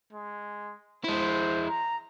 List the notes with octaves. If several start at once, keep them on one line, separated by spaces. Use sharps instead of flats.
G#3
G#3 E4 C5
A#5